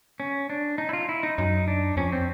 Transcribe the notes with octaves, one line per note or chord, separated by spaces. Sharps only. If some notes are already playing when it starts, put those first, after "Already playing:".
C#4
D4
D#4
E4
F4
E4
D#4
F#2 D#4
D4
F2 C#4
C4